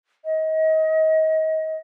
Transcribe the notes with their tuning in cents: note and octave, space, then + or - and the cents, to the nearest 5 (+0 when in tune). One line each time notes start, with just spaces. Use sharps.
D#5 +30